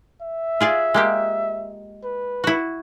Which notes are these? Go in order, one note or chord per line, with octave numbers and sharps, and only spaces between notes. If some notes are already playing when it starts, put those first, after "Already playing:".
E5
F4 G#4 D5
G#3 A#3 G4
B4
E4 F#4